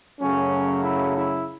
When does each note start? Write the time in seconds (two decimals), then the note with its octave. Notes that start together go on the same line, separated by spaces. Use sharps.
0.20 F#2 C#3 F#3 A3 C#4
0.84 E4
1.16 E4